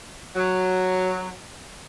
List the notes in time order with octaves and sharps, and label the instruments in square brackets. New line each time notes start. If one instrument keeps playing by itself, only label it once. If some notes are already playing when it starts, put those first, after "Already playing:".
[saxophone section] F#3